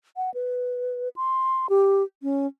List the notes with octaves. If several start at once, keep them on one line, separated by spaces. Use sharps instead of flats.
F#5
B4
C6
G4
C#4